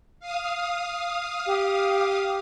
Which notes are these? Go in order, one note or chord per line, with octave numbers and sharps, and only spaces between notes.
F5 D#6
G4